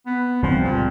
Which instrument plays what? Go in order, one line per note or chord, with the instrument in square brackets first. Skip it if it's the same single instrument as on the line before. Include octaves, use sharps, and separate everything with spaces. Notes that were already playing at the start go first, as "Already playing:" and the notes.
[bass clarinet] B3
[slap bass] C#2 G3 C4 [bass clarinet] F3
[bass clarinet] A#2